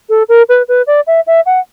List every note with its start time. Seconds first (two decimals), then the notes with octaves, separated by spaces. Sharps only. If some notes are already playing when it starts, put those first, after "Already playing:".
0.09 A4
0.29 A#4
0.49 B4
0.68 B4
0.87 D5
1.07 E5
1.27 E5
1.46 F#5